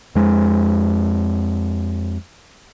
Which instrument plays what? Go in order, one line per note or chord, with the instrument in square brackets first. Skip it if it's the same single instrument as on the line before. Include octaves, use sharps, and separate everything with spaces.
[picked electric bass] F2 G#3